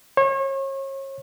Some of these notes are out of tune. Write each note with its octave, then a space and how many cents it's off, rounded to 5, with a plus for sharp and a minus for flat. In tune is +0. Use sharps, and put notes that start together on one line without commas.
C#5 -35